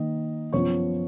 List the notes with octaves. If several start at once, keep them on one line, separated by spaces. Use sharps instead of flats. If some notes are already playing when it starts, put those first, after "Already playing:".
Already playing: D#3 A#3 D#4 D#5
F#2 F3 B3 F4 C#5 C#6